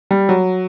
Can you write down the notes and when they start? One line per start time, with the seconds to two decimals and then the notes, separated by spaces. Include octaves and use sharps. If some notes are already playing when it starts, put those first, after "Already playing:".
0.11 G3
0.29 F#3